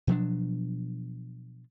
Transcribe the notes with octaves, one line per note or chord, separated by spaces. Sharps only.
B2 F3 F#3 D4